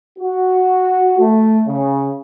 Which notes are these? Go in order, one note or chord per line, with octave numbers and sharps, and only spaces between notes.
F#4
A3
C#3